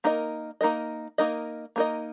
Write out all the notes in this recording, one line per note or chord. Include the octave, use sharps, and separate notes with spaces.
A#3 D#4 A#4 D#5
A#3 D#4 A#4 D#5
A#3 D#4 A#4 D#5
A#3 D#4 A#4 D#5